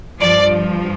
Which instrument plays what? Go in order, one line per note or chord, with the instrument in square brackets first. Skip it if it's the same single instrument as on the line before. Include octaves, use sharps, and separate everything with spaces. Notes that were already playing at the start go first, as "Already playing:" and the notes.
[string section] G2 F3 D5